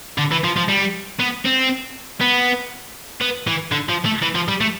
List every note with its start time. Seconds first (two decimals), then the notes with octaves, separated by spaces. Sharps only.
0.18 D3
0.32 E3
0.44 F3
0.57 F3
0.69 G3
1.19 B3
1.45 C4
2.21 B3
3.21 B3
3.47 E3
3.72 D3
3.89 F3
4.05 A3
4.22 E3
4.35 F3
4.48 G3
4.61 A3